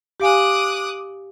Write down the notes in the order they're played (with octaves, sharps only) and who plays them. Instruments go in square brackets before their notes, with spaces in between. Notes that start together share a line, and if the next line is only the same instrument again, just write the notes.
[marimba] G4 F5 G#5 [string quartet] D6 D#6 F#6